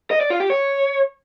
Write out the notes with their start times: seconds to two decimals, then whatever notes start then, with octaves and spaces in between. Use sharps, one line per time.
0.11 D#5
0.21 D5
0.30 F4
0.40 G4
0.50 C#5